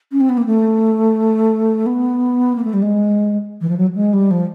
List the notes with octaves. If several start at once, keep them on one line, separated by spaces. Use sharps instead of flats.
C#4
C4
B3
A#3
A3
B3
A#3
A3
G3
G#3
E3
F3
F#3
G#3
G3
F3